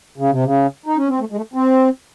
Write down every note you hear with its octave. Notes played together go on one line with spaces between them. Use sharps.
C#3
C3
C#3
D#4
C#4
C4
A3
G#3
A3
C4